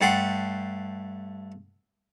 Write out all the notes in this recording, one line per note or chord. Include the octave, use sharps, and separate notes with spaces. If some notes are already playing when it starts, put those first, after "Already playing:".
G2 A3 F#5 G5 C6